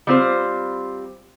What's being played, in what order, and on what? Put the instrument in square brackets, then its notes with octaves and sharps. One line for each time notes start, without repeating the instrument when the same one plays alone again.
[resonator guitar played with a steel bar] G3 C4 F4 C5